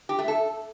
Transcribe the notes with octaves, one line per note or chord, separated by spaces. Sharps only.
G4
A3
A4